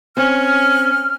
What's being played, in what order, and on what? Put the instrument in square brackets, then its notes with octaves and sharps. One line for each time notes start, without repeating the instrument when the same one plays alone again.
[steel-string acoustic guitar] C4 [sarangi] C#4 [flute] F6